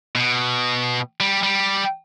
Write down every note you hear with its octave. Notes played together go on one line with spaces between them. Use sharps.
B2
G3
G3